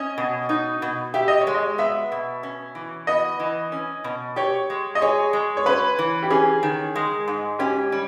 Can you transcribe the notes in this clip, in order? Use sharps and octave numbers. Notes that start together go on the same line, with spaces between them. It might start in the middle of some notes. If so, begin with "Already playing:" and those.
Already playing: C#4 D#5
B2
D#4
B2
G4 E5
D#5
C#5
G#3
D#5
B3 E5
B2
C#4
E3
B3 D#5
E3
C#4
B2
G4 C#5
G#3
D#5
G#4 C#5
G#3
C#5
C#4 B4
E3
G4
C#4 G#4
D#3
G#3
G#2
C#4 G4
G3